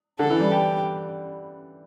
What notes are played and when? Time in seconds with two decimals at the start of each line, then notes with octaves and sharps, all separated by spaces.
0.19 D3 A4
0.30 E3
0.40 G3
0.51 G4